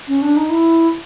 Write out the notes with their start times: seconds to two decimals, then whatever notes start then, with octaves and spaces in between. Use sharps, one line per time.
0.08 C#4
0.22 D4
0.37 D#4
0.50 E4